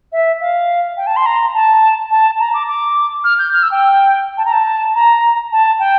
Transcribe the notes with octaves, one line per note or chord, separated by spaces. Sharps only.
E5
F5
G5
A5
C6
A#5
A5
A5
A#5
D6
D6
F6
G6
F6
E6
G5
A5
A#5
A5
A#5
A5
G5